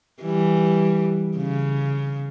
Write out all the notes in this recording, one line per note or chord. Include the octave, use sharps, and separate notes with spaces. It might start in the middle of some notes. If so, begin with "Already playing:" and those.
E3 G3
C#3